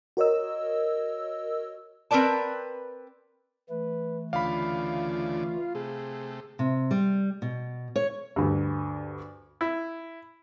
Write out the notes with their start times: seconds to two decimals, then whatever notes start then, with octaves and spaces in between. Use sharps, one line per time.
0.17 F#4 A#4 C#5 D#5 E6
2.11 C4 A#4 B4 D5 A5
3.70 E3 A3 B4
4.33 D2 C#3 F4 D5 F5 B5
5.75 C3 A3 G#4
6.59 C3
6.91 G3
7.42 B2
7.96 C#5
8.36 D2 G2
9.61 E4